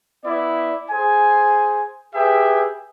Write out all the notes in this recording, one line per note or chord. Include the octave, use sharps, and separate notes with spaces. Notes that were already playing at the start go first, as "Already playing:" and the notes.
B3 E4 D5
G#4 C5 G#5
G4 G#4 B4 E5 G5